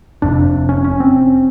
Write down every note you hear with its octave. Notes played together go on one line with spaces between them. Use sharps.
F1 F2 C3 D4
C#4
C#4
C4